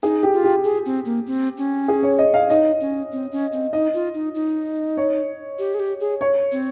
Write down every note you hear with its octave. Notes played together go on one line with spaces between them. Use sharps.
D#4 G#4
G4
F4
G4
G#4
C4
A#3
C4
C#4
G#4
C#5
D#5
F5
D#4 D#5
C#4
C4
C#4
C4
D#4 D#5
F4
D#4
D#4
C#5
G4
G#4
G4
G#4
C#5
C4